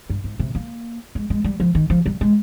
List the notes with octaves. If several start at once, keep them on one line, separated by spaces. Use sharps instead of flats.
G2
G#2
C3
A#3
G#3
G#3
G3
F3
D#3
F3
G3
G#3